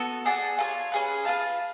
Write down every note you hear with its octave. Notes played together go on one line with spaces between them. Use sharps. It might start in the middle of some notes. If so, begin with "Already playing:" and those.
Already playing: B3 F#4 A4
G#4 D5 F#5 A5
F4 A4 C#5
C#4 G#4 B4
F4 B4 F5 A5